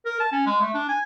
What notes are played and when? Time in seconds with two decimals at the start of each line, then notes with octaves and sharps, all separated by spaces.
0.06 A#4
0.20 A5
0.32 C#4
0.46 G#3
0.61 A3
0.74 D4
0.89 G#5